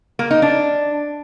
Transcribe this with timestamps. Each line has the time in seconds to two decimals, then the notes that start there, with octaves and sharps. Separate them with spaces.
0.19 A#3
0.31 D#4
0.42 D4